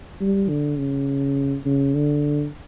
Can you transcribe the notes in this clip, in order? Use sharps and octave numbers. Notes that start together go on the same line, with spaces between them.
G3
D3
C#3
C#3
D3